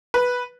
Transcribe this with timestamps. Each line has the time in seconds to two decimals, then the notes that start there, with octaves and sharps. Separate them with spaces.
0.14 B4